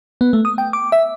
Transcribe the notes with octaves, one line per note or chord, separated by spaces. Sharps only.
B3
A3
D#6
G5
D6
E5